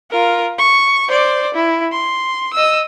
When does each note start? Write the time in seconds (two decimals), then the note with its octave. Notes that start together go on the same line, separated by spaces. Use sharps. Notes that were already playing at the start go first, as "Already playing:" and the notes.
0.11 F4 A#4
0.58 C#6
1.09 C5 D5
1.54 E4
1.92 C6
2.53 D#5 E6